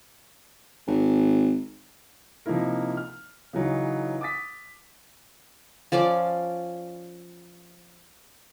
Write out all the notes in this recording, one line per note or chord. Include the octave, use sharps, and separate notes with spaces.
G#1
C3 F3 A#3 D#4 E4 A#4
F6
C#3 E3 F#3 D#4
D6 D#6 A6 B6
F3 C#4 D5 D6